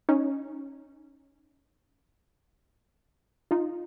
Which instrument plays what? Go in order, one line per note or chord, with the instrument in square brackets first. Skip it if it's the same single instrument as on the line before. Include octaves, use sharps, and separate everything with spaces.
[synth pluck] C#4 D#4
D#4 F4